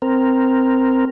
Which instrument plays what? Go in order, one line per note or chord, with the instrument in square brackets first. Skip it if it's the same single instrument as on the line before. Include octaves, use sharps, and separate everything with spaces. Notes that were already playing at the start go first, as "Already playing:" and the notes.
[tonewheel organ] C4 A#4